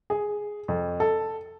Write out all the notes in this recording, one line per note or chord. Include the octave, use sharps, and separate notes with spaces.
G#4
F2
A4